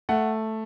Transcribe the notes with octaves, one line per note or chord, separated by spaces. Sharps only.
A3 F#5